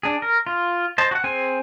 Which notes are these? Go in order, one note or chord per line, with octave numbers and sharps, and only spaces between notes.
D4 G#4
A#4
F4
C5 D#5 A5
F#4 F#5
C4 G#4 C5 G#5